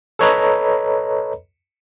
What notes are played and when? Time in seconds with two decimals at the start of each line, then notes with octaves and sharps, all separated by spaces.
0.19 A4 B4 C#5 D#5 A#5 B5